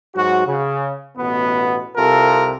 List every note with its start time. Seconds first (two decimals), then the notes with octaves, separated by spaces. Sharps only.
0.15 G#2 F#3 F#4
0.47 C#3
1.18 A1 B2 B3
1.97 C2 C3 F4 A4 A#4